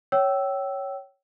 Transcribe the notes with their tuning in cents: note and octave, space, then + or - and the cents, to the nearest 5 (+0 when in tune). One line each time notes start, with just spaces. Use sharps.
C#5 +0 G5 -30 E6 +0